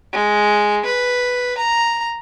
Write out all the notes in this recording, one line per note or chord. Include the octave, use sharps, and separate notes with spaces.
G#3
B4
A#5